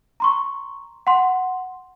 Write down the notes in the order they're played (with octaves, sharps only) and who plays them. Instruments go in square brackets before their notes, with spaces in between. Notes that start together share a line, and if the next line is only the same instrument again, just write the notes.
[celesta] A#5 C6 C#6
F#5 C6